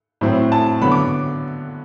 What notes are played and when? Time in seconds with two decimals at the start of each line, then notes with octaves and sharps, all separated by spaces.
0.21 A2 F#3 C4 E4
0.52 A5
0.82 D3 F#3 B3 B5
0.91 D6